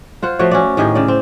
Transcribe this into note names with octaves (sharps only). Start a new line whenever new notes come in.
F4 C5 F#5
F3 A3 F#4 C#5
C#4 F#4 D5
A2 D#3 G4 G#4
C#3 D5
C4